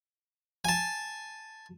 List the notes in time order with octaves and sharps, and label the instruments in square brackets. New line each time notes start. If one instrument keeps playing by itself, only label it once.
[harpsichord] G#5 A5